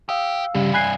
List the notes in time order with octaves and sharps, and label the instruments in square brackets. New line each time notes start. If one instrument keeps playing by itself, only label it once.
[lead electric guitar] G4 [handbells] F5 E6 [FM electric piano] D#6
[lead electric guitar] C2 G2 [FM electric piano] C#3 G3 G4
[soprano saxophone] G#5 [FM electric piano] B5 F#6 C7